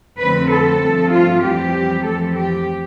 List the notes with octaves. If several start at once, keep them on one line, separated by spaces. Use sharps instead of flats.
F2 D3 A3 C4 B4
A4
G2 F3 A3 C4
F4
F2 E3 G3 C4 G4
F2 E3 A3 C4 A4
G4